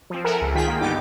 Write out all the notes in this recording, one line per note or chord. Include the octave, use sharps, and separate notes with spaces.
F3 C4
A4 A#4 E5 F#5 G#5
C#2
D#3 F4 G#4 G5 B6
D#3 A#3
G2 D3 B3 D#4 G4 D6